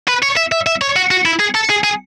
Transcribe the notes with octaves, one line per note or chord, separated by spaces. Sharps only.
B4
C#5
E5
E5
E5
C#5
F#4
F#4
E4
G#4
A4
G#4
G#4